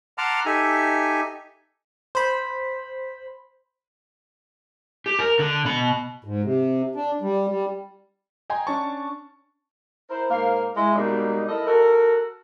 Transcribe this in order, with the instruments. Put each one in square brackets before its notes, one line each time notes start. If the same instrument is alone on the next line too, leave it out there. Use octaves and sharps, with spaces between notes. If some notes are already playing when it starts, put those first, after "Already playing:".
[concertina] F#5 A5 A#5 C6 D6 F6
D#4 G4 A4 E5 G#5
[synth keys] C5 B5
[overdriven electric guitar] G4
A#4
D3
B2 B5
[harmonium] G#2
C3
D4
G3
G3
[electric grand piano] D#5 G5 G#5 A#5 C6
C#4 D4 C#5 A5 C#6
[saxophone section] E4 A#4 C5
G#2 A#3 C5 F5
G#3 E4
B2 G3 G#3 A#3 D#4
E4 A4 A#4 D#5
F#4 A4 A#4